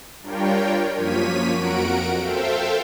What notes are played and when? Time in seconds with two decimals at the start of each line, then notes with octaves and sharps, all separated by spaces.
0.22 G3 D4 F4 A#4 C#5 G5
0.97 F#2 F3 A#3 C#5 B6 D#7
1.53 F2 F#4 A#4 F#5 D7
2.20 A4 C5 E5 F5 G5